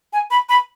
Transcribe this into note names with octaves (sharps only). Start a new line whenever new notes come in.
G#5
B5
B5